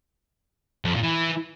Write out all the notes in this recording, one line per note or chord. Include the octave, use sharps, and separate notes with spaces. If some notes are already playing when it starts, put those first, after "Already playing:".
F2
A#2
E3